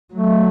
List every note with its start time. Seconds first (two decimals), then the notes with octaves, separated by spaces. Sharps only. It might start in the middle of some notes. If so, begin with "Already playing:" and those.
0.14 F#3 A3